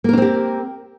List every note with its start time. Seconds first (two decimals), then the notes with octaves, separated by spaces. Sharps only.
0.04 A#3
0.09 A#4
0.13 D4
0.18 C4
0.22 G4